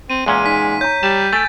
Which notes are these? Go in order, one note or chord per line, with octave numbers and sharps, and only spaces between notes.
C4 D#7
E2 A#2 G#3 C#4
D#4 G#5 B6
C#5 A#5 G6
G3 A5
A3 G#5 A6 D7